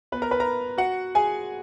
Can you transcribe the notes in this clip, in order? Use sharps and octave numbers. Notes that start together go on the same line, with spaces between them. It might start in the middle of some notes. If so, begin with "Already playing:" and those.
B3 B4
A#4 A#5
B4 B5
A#4 A#5
F#4 F#5
G#4 G#5